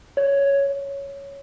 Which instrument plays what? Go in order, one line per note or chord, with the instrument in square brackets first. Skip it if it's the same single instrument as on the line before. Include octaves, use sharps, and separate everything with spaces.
[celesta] C#5